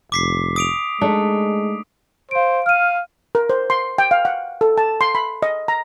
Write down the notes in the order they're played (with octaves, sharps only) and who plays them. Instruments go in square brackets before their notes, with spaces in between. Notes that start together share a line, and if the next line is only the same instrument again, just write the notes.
[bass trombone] F1 [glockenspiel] D6 B6 C7
[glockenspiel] D#6 D7 F7
[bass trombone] G#3 [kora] A3 D4 D#4
[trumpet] C5 [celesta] F5 D7
[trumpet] F5 [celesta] F6 D#7
[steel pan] A#4
C5
C6
G5
F5
F#5
A4
A5
C6
B5
D#5
A#5